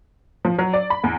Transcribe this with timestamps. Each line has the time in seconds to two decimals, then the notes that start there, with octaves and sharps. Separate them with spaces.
0.45 F3
0.58 F#3
0.73 D5
0.90 B5
1.04 E2